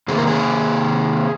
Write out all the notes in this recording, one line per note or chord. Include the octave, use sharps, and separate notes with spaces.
C3 D#3 A#3 G#4
A#4
G#4